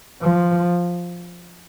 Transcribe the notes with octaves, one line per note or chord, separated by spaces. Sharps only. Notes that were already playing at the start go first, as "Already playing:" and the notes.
F3